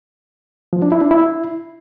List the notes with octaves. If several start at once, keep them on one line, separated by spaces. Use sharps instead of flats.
F3
D4
E4
D4
E4